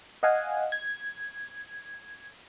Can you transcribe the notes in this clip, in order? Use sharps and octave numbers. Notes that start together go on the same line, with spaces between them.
D#5 F5 F#5 G#5
G#6